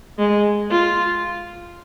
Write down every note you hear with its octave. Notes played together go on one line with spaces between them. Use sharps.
G#3
F4